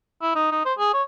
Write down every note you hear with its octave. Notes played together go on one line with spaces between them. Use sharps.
E4
D#4
D#4
C5
G#4
C#5